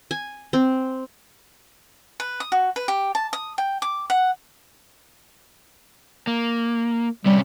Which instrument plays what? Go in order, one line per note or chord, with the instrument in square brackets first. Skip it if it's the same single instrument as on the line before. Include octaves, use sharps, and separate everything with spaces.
[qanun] G#5
C4
[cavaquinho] B4
D#6
F#4
B4
G4
A5
D#6
G5
D6
F#5
[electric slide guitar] A#3
[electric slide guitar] C3 C#4 [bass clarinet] G3